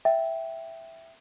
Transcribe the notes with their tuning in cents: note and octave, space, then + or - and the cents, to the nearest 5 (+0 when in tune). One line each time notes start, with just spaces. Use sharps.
E5 +0 G5 -5